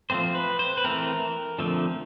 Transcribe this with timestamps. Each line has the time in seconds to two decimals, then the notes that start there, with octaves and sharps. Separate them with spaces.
0.10 F3 A3 C4 C5
0.35 B4
0.59 C5
0.77 B4
0.84 E3 A3 C4 A#4
1.59 D3 F3 A3 C4